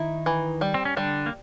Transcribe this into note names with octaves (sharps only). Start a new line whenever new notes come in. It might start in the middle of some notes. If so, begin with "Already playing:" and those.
Already playing: D#3 D#4 E4
E3
G3
C4
C#4
D3 G3 D4
A#3